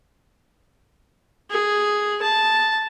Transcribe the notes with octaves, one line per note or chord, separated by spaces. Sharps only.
G#4
A5